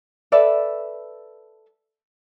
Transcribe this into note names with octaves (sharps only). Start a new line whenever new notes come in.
A4 B4 D5 E5